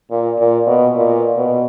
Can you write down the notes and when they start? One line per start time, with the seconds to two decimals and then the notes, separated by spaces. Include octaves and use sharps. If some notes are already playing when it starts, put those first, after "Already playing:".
0.11 A#2
0.39 A#2
0.67 B2
0.95 A#2
1.37 B2